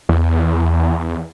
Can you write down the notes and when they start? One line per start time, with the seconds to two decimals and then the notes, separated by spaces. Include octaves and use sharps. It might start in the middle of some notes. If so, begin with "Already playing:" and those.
0.09 E2